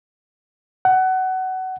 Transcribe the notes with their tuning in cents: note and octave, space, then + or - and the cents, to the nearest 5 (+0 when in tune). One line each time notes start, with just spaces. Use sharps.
F#5 +20